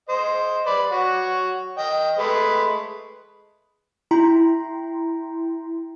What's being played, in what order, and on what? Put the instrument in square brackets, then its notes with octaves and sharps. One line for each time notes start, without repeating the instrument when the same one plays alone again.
[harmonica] C5 D#5
B4 D5
F#4 C#5
D#5 G5
G#3 A3 B4
[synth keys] E4 G5 A#5 C6